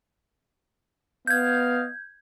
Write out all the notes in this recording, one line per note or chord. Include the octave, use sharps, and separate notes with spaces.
B3 D#5 F5 G6 G#6